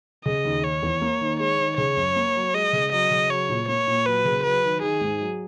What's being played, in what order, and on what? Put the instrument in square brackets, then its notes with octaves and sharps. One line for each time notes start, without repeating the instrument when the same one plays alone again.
[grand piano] C#3 [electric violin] D#5
[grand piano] D#2
[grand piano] D#3 [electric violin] C#5
[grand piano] E2
A#3
D#3
[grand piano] G#3 [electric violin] C#5
[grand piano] D#3
[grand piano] C#3 [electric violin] C#5
[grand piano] F#2
A#3
F#3
[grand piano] G#3 [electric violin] D#5
[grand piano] C#3
[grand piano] F#3 [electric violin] D#5
[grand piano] C#3
[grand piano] F#3 [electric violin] C#5
[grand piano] A#2
[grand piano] A#3 [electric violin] C#5
[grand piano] A#2
[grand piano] F#3 [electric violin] B4
[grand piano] C#3
[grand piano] F#3 [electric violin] B4
[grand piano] D#3
[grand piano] D#3 [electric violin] G#4
[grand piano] G#2
F#3